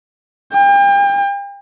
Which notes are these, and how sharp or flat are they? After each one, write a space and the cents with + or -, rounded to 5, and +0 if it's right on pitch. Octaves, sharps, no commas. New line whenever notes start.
G5 +40